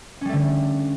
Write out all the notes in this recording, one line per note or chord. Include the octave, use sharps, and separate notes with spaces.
D3 G3 A3 C#4